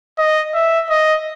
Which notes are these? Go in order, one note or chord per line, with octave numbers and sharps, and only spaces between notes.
D#5
E5
D#5